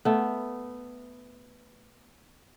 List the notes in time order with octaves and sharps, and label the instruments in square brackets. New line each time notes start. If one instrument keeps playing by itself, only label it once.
[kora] A3 B3